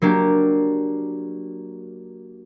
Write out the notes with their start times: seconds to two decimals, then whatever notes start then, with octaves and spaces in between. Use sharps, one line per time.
0.02 F#3 A#3 D4 G4